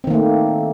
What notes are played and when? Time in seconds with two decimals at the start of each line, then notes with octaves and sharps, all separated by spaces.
0.04 C4
0.07 D#3
0.10 A#3
0.14 A3